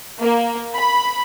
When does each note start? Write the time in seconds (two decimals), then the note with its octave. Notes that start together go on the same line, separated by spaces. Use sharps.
0.21 A#3
0.74 B5